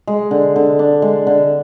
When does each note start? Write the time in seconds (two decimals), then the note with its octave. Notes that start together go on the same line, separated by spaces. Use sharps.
0.07 G#3
0.31 D3
0.56 D3
0.79 D4
1.02 G#3
1.27 D3